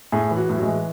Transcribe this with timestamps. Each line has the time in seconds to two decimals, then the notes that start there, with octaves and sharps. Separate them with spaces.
0.12 A2 G#4
0.31 E3
0.37 F#4
0.49 A2
0.57 F#3
0.62 G#3
0.67 E3